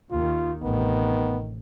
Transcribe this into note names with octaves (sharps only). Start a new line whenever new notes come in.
D#2 D#3 F4
A1 C3 D#3 B3